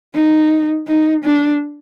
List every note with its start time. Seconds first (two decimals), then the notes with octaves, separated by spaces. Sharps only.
0.15 D#4
0.88 D#4
1.25 D4